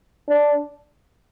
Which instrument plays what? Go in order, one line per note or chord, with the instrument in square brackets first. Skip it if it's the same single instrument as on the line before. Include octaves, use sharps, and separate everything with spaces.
[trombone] D4